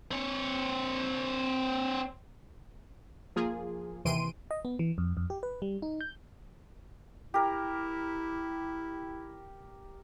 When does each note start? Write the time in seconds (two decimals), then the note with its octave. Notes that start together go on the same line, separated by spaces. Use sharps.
0.11 C4 C#5
3.36 F3 A#3 F4 G#4
4.05 D#2 C3 E3 C6 D7 D#7
4.51 D#5
4.65 B3
4.79 E3
4.98 F2
5.17 F2
5.30 G4
5.43 B4
5.62 G3
5.82 D#4
6.01 G6
7.34 E4 G4 A#4